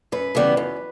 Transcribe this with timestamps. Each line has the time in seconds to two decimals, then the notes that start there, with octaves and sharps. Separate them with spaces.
0.12 F#2 B4
0.35 C#3 E3 G3 B3
0.57 F#2